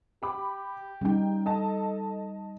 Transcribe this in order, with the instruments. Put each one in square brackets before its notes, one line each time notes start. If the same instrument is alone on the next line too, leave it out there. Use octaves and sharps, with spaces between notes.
[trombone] G4 [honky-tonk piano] B5 D6
[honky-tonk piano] C#3 G5 [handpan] G3 D#4
[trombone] A4 [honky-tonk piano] D#5 A5